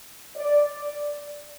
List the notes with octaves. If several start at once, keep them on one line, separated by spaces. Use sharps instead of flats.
D5